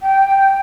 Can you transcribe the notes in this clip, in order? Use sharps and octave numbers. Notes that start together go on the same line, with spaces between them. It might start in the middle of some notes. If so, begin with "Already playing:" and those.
G5